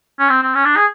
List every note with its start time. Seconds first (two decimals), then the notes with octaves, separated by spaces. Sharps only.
0.19 C#4
0.29 C4
0.43 C4
0.55 C#4
0.65 D4
0.76 G#4